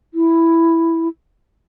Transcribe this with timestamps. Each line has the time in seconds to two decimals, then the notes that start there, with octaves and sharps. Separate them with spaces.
0.14 E4